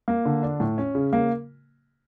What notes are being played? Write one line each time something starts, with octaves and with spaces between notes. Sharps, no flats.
A#3
D3
D4
A2
C#4
C#3
A#3